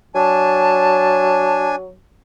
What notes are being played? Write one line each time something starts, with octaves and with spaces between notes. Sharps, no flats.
F#3 D4 G#5 A5